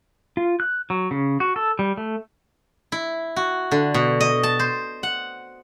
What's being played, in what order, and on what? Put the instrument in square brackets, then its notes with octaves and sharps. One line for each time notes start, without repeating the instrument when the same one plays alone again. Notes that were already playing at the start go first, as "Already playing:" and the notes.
[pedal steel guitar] F4
F#6
F#3
C#3
F#4
A4
G3
A3
[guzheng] E4
F#4
D3
B2
D#5
A5
C5
F#5